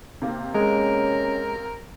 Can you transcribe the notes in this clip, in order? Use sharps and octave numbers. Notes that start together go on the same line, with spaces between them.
C3 A#3
G#3 C#4 A#4